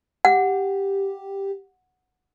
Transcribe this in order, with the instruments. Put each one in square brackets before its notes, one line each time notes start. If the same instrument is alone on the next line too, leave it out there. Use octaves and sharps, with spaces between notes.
[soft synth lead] G4 [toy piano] F#5